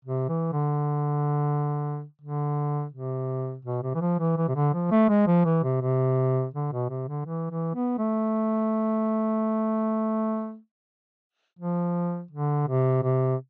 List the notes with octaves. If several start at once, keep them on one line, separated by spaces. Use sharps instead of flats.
C3
E3
D3
D3
C3
B2
C3
E3
F3
E3
E3
C3
D3
F3
A3
G#3
F3
E3
C3
C3
D3
B2
C3
D3
E3
E3
B3
A3
F3
D3
C3
C3